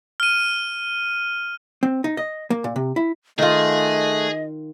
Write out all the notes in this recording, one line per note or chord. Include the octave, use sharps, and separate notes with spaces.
F6 D#7
C4
D#4
D#5
A#3
A#2
C3
E4
D#3 A3 F4 G#4 D#5 F#6